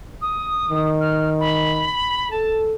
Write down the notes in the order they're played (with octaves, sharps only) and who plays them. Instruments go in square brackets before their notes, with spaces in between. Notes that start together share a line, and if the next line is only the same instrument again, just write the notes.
[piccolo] D#6
[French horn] D#3
[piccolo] F6
B5
[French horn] A4 [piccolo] A5